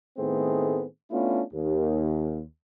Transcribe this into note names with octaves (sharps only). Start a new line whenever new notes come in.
A2 D#3 A3 B3 C4 G#4
A3 B3 C#4 D4 E4 F4
D#2